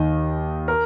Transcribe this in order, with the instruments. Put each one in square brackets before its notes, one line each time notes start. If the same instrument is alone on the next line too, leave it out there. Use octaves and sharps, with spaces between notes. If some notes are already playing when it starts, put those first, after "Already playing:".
Already playing: [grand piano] D#2 D#3 D#5
A#4